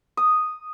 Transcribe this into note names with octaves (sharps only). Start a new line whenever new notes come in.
D#6